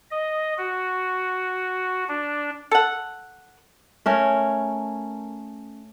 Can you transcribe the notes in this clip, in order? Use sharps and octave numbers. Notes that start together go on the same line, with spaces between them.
D#5
F#4
D4
A4 F#5
A3 C#4 A#4